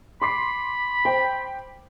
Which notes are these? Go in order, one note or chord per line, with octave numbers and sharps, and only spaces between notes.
B5 C6 D6 C7
C5 G5